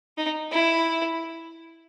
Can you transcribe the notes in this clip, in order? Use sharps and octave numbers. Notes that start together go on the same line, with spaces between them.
D#4
E4